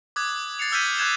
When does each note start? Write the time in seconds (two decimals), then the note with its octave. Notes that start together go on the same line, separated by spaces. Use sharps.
0.16 D6 D#6 F#6 G#6
0.59 A6 C7 C#7 F7
0.72 E6 F6 G6 G#6 B6 D#7
0.98 D6 F#6 G#6 E7